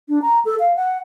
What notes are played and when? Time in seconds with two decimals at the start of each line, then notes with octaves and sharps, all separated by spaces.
0.09 D4
0.22 A#5
0.45 A4
0.60 F5
0.76 F#5